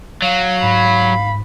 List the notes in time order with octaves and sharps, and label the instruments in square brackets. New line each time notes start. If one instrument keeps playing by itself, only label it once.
[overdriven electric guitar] F#3 [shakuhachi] F5
[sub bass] G#2 [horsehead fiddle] B5